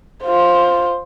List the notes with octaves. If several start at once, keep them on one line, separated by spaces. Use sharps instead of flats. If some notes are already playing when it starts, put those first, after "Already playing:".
F4 C5